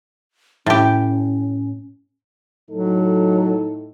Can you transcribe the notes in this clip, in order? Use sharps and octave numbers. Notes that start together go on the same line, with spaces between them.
A2 C#4 G4
A2 F#3 D#4 A4